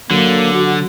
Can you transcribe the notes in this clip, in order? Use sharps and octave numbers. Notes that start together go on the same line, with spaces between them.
D3 F#3 A#3
F#4